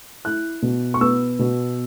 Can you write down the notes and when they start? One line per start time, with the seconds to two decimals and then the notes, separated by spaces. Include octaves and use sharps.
0.25 E4 F#6
0.62 B2
0.94 C#6
1.01 B3 E6
1.39 B2